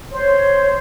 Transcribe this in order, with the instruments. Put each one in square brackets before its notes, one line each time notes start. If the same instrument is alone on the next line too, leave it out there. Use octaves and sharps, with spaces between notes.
[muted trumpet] C5 [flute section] C#5